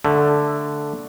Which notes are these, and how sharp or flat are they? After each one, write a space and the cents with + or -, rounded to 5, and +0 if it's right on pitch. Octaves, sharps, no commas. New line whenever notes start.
D3 +0 A3 +0